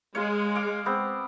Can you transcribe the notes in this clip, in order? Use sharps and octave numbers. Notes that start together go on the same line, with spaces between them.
G#3 C#5 F5 C6
F5 D6
B3 C4